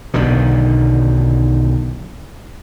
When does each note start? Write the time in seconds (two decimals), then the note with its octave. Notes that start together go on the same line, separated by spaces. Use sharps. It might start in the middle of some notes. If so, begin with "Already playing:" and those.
0.14 B1 B2 D3 D#3